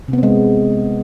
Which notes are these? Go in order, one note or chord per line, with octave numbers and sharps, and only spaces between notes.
C3 G#3 B3 C4